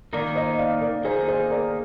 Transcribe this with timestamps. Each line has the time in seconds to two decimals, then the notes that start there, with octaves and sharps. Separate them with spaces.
0.13 D#3 A#3 D#4 A#4 D5
0.35 C5 D#5
0.58 D5 F5
0.81 A#4 D5
1.04 D#3 A#3 D#4 G#4 C5
1.28 G#4 C5
1.50 A#4 D5